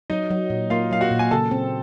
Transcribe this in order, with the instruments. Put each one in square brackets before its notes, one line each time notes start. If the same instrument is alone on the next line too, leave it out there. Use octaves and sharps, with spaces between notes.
[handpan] F#3 [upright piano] D#4 D#5
[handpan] F#3
A#2
[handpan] A#3 [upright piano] F4 F5
[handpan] F#3 [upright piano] F5
[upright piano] F#4 F#5
[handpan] A#2
[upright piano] G#5
[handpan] C#3 [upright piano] A4 A5
[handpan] C4